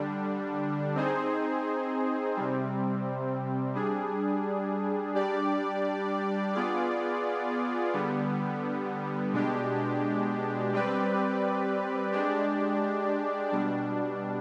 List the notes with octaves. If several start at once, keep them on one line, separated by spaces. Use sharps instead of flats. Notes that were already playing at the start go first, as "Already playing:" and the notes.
Already playing: D3 G3 D4
C4 D#4 G#4 C5
C3 G3 C4
G3 D4 G#4
G3 D4 G4 D5
B3 F4 G#4 D5
D3 G3 B3
B2 G#3 D4 G4
G3 C4 G4 B4 D5
G#3 D4 G4 D5
B2 G3 D4